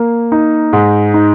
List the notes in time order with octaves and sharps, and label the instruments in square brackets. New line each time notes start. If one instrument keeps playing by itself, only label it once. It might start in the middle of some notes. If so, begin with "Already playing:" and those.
Already playing: [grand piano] A#3
D#4
G#2
D#4